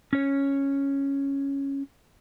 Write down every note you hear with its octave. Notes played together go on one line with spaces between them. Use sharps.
C#4 C#5